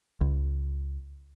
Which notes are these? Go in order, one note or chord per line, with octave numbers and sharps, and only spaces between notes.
C#2